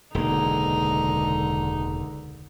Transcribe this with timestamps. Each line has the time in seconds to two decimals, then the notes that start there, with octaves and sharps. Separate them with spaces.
0.15 E1 C#2 D3 A#3 D#4